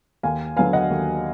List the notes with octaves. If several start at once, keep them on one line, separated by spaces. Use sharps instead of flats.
D#2 F5 G#5
D3 F#3 B3 F5 G#5
D#5 F#5
D#2